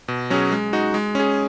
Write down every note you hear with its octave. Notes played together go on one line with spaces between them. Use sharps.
B2
F#3 C#4 G#4
G#3
D#4 F#4
G#3
C#4 G#4